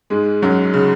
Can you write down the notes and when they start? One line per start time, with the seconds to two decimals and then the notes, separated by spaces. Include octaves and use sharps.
0.10 G#2 G#3
0.42 F#2 F#3
0.73 C#3